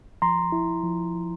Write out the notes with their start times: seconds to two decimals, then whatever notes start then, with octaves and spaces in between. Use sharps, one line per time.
0.22 F3 A#5 C6
0.52 E4
0.84 F3
1.15 F3